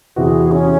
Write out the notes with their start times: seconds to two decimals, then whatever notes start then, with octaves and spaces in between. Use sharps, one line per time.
0.16 E2 C3 E3 C4 F#4 G#4
0.52 C#4